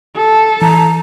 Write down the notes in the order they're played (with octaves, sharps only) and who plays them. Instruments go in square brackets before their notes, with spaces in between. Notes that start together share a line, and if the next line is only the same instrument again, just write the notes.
[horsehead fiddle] A4
[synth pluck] E3 [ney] A#5